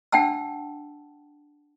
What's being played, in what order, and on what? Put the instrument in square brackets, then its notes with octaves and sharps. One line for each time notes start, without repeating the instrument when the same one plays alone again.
[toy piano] D4 F#5 G5 A5 E6